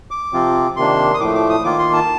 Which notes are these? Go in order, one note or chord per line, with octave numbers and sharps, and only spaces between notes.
D6
C3 F3 C4 F4
C3 D#3 A#3 D4 C6
D#6
A2 F3 A3 D6
D6
D#6
D#3 A#3 F4 D6
C6
A5